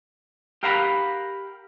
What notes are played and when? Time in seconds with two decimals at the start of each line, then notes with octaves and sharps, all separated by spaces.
0.63 G4 A#4 F5 F#5 A#5 B5